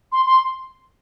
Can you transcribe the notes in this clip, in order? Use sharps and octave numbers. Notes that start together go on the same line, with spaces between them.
C6
C6